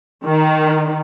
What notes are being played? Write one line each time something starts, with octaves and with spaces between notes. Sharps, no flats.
D#3